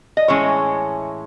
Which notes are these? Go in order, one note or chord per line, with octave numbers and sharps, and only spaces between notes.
D#5
A2 E3 G#3 C#4 C#5